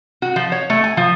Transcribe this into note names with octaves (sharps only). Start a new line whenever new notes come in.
F#4
F3
C#5
A3
G#5
F3